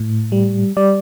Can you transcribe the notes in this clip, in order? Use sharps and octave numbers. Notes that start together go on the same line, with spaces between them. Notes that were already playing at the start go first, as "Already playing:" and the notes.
Already playing: A2
G3
G3 D5